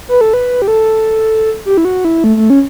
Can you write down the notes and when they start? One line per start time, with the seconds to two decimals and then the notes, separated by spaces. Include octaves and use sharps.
0.09 B4
0.21 A4
0.34 B4
0.62 G4
0.68 A4
1.66 G4
1.77 E4
1.85 F#4
2.05 E4
2.24 A3
2.37 A3
2.50 C#4